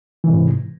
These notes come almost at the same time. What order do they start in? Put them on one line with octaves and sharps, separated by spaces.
E3 C3 G#2